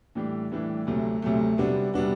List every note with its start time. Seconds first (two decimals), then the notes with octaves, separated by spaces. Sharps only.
0.15 A2 E3 G3 D4 G4
0.52 A2 E3 G3 D4 G4
0.87 D2 C3 F#3 A3
1.22 D2 C3 F#3 A3
1.58 C3 G3 B3 D4 F#4
1.94 C3 G3 B3 D4 F#4